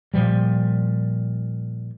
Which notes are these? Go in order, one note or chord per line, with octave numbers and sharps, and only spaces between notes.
A#2 F3 G3